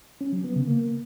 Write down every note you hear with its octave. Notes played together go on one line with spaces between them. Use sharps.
C#4
F#3
B3
C#3
A#3